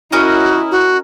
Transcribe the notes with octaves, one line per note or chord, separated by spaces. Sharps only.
C#4 E4 F#4 A#4 D#5
F#4